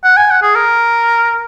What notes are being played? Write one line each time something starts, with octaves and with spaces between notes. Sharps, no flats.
F#5
G#5
F#5
G#4
A#4